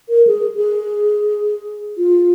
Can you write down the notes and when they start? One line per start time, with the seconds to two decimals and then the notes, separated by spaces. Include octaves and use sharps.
0.09 A#4
0.27 G#4
0.56 G#4
1.98 F4